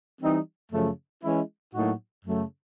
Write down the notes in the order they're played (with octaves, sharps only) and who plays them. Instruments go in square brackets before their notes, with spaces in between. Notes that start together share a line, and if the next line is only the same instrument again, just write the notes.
[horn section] E3 G3 C4 D#4
F#2 C#3 F3 A3
E3 G#3 C#4 E4
A2 F#3 A#3 D#4 F#4
F#2 C#3 F#3 A3